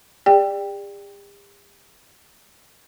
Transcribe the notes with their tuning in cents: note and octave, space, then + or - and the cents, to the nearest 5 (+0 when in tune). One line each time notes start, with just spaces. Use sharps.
G4 +45 D5 +10 G5 +10